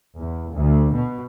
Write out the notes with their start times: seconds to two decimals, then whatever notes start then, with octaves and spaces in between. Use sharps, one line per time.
0.18 E2
0.55 D2
0.94 B2